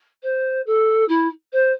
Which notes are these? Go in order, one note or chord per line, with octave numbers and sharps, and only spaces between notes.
C5
A4
E4
C5